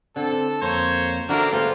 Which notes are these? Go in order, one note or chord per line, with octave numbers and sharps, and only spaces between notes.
D3 C4 D4 A4
F2 A#3 C5 C#5 A#5
D3 A#3 D4 F#4 A#4 C5 E5
G3 A3 B3 F4 G#4 C5